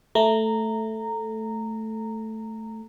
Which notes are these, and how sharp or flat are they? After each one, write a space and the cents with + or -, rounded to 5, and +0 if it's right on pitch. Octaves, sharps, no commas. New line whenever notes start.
A3 +0 A#5 -15